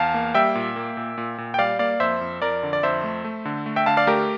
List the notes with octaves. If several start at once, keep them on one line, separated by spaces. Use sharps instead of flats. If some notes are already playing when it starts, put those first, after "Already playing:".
Already playing: E2 F5 A5
A#3
G3 E5 G5
A#2
A#3
A#2
A#2
A#2
G5
G3 D5 F5
A#3 D5 F5
F2 C5 E5
F2
F2 A#4 D5
D3
D5
F2 C5 E5
A3
A3
D3
A3
E5 G5
D3 F5 A5
D5 F5
A3 G4 A#4